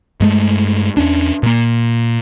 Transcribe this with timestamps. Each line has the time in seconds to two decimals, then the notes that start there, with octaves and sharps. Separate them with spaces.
0.20 G2 G#3 A3
0.97 E2 C#4 D4
1.43 A#2 A#3